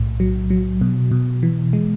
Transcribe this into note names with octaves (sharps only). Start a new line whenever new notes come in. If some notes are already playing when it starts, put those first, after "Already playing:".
Already playing: B1 A2
F#3
F#3
B2
B2
E3
G#3